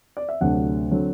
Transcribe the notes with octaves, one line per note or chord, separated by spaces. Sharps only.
D5
E5
D2 C3 F#3 A3 D4 F#5
D3 F#3 C4